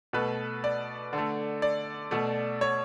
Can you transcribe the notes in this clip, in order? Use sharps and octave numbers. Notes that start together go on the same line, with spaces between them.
B2 A3 B4
D5
D3 A3
D5
B2 A3
C#5